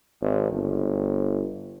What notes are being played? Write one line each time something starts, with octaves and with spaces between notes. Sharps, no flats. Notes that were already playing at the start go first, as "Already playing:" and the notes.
G#1
G1